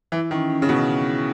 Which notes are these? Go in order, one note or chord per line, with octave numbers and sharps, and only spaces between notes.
E3 E4
D#3 C#4
C#4
C#3
B2 C#4
C#4
E4